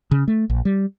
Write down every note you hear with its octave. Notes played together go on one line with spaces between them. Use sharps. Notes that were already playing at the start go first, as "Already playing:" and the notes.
C#3
A3
A#1
G3